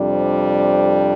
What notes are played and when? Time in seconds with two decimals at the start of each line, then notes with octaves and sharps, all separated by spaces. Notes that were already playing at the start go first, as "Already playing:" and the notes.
Already playing: F2 C3 G3 D4
0.09 C5